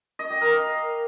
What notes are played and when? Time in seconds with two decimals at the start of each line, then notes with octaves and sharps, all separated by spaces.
0.19 D#5
0.30 G4
0.41 A#4
0.52 F5